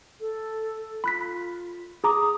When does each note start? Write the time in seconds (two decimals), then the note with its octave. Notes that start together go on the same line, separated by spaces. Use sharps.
0.20 A4
1.04 F4 B5 F#6 B6
2.04 G#4 A#5 D6 D#6